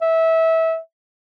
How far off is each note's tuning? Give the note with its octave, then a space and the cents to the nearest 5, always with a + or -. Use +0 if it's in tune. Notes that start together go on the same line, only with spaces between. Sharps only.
E5 -20